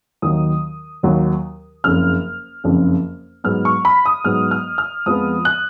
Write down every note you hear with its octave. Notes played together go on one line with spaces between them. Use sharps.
D#2 D#3 F#3 D#6
D#2 D#3 F#3
F#1 F2 C#3 F6
F#1 F2 C#3
G#2 F#3 B3 F6
C#6
B5
D#6
G#2 F#3 B3 F6
F6
F6
F2 F3 G#3 B3 D#6
F#6